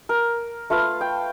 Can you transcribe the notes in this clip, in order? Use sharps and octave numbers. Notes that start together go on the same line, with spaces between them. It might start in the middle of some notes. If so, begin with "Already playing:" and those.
A#4
A3 F4 B4 F5
G5